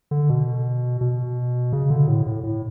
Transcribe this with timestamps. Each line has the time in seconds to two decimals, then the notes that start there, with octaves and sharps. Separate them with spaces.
0.11 D3
0.29 B2
1.01 B2
1.73 C#3
1.90 D3
2.08 A2
2.26 A2
2.43 A2